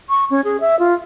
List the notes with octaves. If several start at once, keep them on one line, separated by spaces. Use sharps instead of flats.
C#6
C#4
G#4
E5
F4